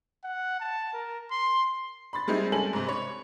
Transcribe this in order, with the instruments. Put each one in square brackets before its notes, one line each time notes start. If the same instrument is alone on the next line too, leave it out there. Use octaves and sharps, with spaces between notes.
[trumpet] F#5
A5
A#4
C6
[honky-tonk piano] B5 C6 A6
G3 G#3 C4 D#4 E4 G#4
G3 G#3 C#4 A4 G#5 F#7
G#2 C3
C#5 B5